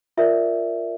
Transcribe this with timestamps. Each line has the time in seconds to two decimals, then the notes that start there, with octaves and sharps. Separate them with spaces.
0.17 F4 A#4 D5 E5